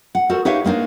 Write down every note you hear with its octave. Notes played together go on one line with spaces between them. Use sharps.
F#5
F#4 A4 A#4 C5
D#4 G4 B4 C#5 E5 F5
G#3 A#3 C4 D4 D#4